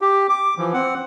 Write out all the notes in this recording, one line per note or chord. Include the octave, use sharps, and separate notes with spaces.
G4
D6
E3 F3
C4 F#5